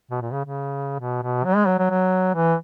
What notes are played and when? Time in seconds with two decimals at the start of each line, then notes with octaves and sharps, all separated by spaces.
0.11 B2
0.21 A#2
0.33 C#3
0.45 C#3
1.00 B2
1.23 B2
1.45 F#3
1.56 G#3
1.67 F#3
1.79 F#3
1.90 F#3
2.35 E3